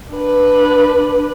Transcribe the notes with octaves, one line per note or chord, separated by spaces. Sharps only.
D4 B4